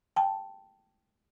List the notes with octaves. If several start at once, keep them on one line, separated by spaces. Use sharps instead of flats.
G5 A5